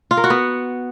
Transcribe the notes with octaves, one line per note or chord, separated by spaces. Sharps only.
F4
A#4
F#4
B3